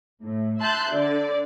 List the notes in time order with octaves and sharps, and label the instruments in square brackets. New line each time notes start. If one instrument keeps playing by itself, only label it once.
[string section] A2
E5 A5 C6 F#6 G6
D3 D5